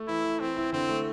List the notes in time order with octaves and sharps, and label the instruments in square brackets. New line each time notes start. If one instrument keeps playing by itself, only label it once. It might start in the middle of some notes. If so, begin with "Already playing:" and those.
Already playing: [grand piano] A3
[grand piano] E3 [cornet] E4
[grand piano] E3
[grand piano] E3 [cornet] C4
[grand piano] E4
[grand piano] D3 [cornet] C4
[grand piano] A3